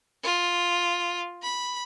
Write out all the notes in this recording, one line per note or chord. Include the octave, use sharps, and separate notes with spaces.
F4
B5